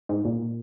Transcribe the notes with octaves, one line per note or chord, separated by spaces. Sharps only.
G#2
A#2